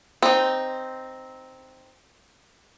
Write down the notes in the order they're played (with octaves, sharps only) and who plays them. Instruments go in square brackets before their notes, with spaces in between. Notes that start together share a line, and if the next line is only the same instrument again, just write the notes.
[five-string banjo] C4 D#4